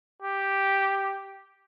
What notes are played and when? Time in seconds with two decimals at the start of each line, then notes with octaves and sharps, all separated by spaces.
0.22 G4